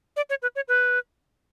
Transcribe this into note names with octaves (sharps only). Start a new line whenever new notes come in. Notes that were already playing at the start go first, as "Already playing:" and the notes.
D5
C#5
B4
C#5
B4